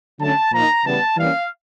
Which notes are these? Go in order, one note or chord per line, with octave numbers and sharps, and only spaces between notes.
D3 F#3 A3 C#4 A5
A#2 F3 A#3 D#4 A#5
C#3 E3 G3 B3 A5
E3 G3 A#3 C#4 F5